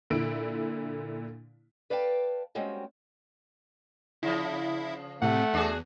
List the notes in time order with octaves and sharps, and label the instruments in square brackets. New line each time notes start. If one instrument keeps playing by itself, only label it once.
[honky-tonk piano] A#2 D3 E4 D7
[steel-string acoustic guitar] B4 D5 F5 G5 A5
G3 G#3 A#3 C4 C#4 F#4
[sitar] C#3 F3 [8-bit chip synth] E4
[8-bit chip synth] A2 C3 [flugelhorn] A3 [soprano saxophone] F#5
[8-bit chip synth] E2 [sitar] D4 F#4 G#4